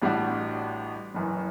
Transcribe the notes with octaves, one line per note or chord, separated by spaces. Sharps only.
A1 A2 G3 D4 F#4
F#1 F#2 E3